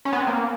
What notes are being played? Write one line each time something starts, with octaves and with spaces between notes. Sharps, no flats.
C#4
B3
C4
A#3